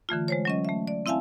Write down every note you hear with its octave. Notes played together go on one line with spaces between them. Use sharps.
D3 E3 A3 F4
G#3 C5 C#5
F#3 C#4 D#5
A3 E5
D5
C4 E4 E5 F5 G#5 A5